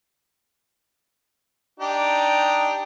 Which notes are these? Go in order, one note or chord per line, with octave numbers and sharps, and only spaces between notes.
D4 D#4 G4